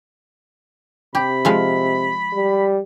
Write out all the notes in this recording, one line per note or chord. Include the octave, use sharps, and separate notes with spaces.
C3 G4 B5
F3 G#3 F5
G3